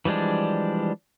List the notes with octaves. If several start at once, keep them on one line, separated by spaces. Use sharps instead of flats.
E3 F3 G3 G#3 D4